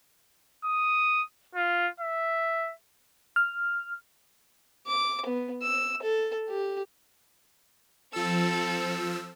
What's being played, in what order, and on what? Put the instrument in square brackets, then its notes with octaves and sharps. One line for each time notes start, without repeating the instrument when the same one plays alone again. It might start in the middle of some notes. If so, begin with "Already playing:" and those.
[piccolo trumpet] D#6
F4
E5
[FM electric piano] F6
[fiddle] D6
B3
E6
A4
G4
[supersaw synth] F3 E6 [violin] C4 A4